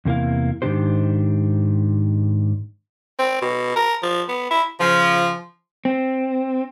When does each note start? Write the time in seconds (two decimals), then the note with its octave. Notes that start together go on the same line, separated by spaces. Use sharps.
0.05 E2 C3 A#3 E4 F5
0.62 G#2 D#3 F3 D4 G4 C5
3.19 C4
3.42 B2
3.76 A#4
4.03 F3
4.29 B3
4.51 E4
4.80 C#3 F3
5.85 C4